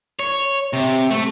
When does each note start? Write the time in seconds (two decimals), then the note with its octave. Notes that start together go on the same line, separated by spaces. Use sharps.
0.19 C#5
0.73 C3
1.11 A3